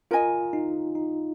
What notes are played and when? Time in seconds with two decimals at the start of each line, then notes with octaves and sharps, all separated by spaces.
0.11 F4 A#4 D#5 G#5
0.53 D#4
0.95 D#4